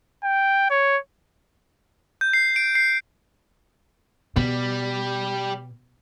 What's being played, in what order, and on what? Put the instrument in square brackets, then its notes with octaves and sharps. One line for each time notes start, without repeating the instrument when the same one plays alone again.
[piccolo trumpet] G5
C#5
[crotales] G6
C7
D7
C7
[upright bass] B2 [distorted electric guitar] G3